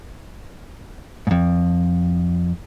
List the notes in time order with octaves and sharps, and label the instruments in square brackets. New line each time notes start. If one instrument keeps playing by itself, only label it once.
[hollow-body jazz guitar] F2 G#2